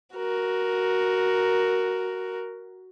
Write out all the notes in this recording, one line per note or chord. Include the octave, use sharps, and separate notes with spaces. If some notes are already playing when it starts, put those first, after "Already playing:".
F#4 A#4